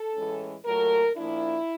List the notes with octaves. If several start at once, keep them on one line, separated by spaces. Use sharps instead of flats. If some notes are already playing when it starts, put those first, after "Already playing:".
Already playing: A4
A2 E3 G#3 C#4
A#2 F#3 A3 A#4
A#2 F3 A#3 D4 E4